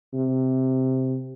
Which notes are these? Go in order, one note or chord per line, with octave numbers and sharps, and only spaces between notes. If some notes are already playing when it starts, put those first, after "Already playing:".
C3